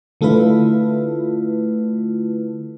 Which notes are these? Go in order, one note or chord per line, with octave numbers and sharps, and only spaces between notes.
D3 A3 E4 F4 B4